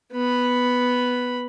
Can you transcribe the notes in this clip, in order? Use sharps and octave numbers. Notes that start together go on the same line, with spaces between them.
B3 B5